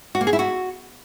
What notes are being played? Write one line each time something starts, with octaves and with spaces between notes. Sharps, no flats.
F#4
A#3
G#4
E4
F#4